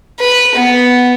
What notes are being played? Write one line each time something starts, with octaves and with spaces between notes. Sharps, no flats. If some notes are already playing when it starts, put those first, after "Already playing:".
B4
B3